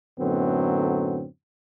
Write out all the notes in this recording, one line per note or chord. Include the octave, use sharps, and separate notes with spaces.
F#2 A2 D3 F#3 B3 C4